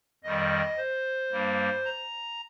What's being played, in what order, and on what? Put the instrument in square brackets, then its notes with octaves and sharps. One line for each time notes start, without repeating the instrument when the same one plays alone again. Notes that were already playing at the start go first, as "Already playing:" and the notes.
[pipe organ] F2 D#3 G3 D#5
C5
G2 G3 A#3
A#5